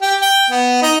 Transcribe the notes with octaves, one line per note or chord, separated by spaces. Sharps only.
G4
G5
B3
D#4